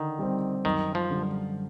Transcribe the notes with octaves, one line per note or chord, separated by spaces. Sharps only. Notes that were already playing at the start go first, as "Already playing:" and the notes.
Already playing: D3 D#3
G3 C4
F#2 D#3
F3
D3 G3